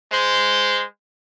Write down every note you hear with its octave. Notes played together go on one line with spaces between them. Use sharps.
G#3 C5